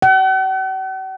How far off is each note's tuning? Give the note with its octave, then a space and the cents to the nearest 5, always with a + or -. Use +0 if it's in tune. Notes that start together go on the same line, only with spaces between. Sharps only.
F#5 +45